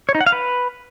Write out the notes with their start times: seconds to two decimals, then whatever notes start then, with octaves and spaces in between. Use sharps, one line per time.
0.09 C#5
0.15 D#4
0.21 F#5
0.26 F5
0.32 B4